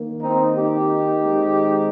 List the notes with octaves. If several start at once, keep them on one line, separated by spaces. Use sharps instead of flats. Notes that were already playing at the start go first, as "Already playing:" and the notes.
Already playing: D#3 A#3
C4 D#4
D#4 G4
D#3 G#3 C4